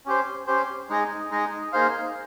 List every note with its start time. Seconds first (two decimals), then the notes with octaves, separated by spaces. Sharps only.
0.05 C#4 G4 C5
0.47 C#4 G4 C5
0.89 G#3 D#4 G#4 D#5
1.31 G#3 D#4 G#4 D#5
1.72 A#3 D#4 G#4 C5 F5